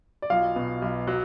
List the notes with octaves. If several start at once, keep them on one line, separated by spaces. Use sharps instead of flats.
D5
B1 F4 F5
B2
B1
F#3